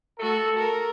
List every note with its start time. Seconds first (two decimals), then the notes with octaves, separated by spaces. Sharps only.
0.19 A3 F#4 A4
0.59 A#4